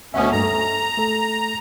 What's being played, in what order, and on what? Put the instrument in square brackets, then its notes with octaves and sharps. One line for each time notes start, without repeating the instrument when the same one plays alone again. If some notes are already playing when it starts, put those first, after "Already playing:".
[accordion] D2 B2 C#4 [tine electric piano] E5 F#5 D#6
[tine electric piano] G2 A3 A#3 [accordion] A#5
[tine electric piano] A4
A3 A4